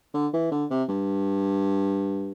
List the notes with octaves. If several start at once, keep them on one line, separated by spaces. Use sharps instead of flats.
D3
E3
D3
C3
G2